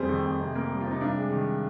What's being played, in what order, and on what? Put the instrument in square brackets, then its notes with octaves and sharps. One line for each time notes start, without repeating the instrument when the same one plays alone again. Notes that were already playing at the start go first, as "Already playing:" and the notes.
Already playing: [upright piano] F2 G3 G#4 C5
D#3
F2
C3
A#3
G3
F4
C3 D#4
G2 D4
G#3
D#3